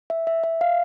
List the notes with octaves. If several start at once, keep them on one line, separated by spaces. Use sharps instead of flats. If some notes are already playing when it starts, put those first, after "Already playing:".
E5
E5
E5
F5